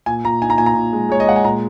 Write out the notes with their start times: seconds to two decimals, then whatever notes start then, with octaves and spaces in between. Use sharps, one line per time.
0.06 A#2 G#5
0.25 A#2 A#5
0.42 D#4 G#5
0.50 A#5
0.58 A#2 G#5
0.66 A#5
0.75 A#2
0.93 G#3
1.09 G#3 C#5
1.20 D#5
1.27 G#3 F#5
1.36 G#5
1.44 A#2 A#5